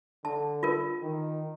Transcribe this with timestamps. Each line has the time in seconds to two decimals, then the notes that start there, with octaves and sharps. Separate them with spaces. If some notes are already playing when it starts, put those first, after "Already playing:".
0.25 D3 A5
0.63 F4 A#4
1.02 D#3